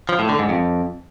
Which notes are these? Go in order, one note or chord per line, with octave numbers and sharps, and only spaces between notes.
F3
A2
D3
G#2
F2